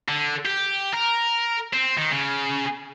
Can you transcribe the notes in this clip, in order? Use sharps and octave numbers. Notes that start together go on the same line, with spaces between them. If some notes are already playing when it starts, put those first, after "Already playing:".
D3
G4
A#4
C4
D#3
C#3